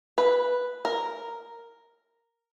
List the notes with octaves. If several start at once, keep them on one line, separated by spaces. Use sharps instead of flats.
B4
A#4